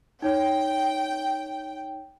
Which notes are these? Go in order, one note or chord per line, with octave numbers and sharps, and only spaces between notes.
D#4 C#5 G5